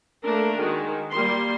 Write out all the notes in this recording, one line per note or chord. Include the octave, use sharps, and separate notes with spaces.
A3 A#3 D4 A#4
D#3 G#3 F#4
G3 A#3 C6